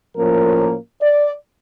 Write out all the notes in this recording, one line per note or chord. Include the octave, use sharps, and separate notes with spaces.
A2 F3 A#3 C#4 A#4
D5